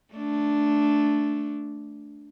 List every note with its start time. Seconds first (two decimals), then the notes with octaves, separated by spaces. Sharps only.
0.13 A3 D4